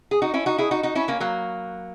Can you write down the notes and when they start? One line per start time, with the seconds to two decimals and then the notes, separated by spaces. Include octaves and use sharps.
0.11 G#4
0.22 D#4 F#4
0.34 C#4 E4
0.46 D#4 F#4
0.58 E4 G#4
0.71 D#4 F#4
0.83 D#4 F#4
0.95 C#4 E4
1.08 A#3 C#4
1.20 F#3 A#3